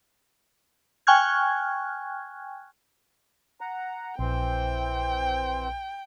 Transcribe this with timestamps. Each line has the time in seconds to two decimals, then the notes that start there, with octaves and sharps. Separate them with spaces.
1.07 G5 G#5 C#6 F6 F#6 G#6
3.61 F#5 A#5
4.19 A#1 E3 C4 C5 G5